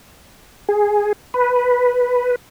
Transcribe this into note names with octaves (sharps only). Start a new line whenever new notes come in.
G#4
B4